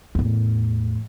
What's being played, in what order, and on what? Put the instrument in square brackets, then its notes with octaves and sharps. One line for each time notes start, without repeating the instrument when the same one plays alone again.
[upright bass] E2 A2